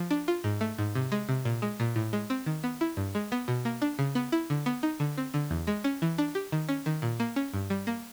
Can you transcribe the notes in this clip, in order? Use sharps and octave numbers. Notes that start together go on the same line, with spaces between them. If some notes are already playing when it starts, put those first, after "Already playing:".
Already playing: F3
D4
F4
G#2
A3
G#2
C3
G#3
C3
A#2
G#3
A#2
A2
G#3
C4
D#3
B3
E4
G2
G#3
B3
B2
A#3
D4
C#3
B3
E4
D3
B3
D#4
D3
C4
D3
E2
G#3
C#4
E3
D4
G4
D#3
C#4
D#3
A#2
A#3
C#4
G2
G3
A#3